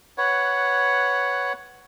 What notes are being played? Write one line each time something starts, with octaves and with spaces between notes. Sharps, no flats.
B4 C#5 F#5